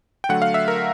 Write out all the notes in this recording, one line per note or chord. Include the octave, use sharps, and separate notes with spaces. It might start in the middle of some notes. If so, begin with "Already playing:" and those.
G5
D3 F#3 A3 F#5
F5
E5
A#4